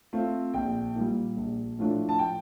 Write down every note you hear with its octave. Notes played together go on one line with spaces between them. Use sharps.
A3 C4 F4
A#1 G5
A#2 G3
A#1
A2 F3 A3 D4
A5
G5